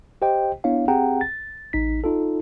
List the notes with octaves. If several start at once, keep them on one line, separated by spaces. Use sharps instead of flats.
G4 C5 D#5 G5
B3 D4 E4 C#5 F5
C4 G4 G#4 F#5 G5 A#5
A6
A1 D#4 B6
D#4 F4 A4